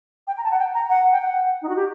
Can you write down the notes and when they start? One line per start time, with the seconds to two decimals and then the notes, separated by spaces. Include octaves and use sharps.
0.27 G5
0.37 A#5
0.44 A5
0.51 F#5
0.59 G5
0.74 A#5
0.90 F#5
1.12 G5
1.22 F#5
1.62 D#4
1.69 F#4
1.76 G4